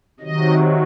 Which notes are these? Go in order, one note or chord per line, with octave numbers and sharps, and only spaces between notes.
C3 D#3 F#3 D#5